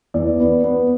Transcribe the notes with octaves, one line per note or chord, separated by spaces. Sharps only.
E2 D5
B3
B3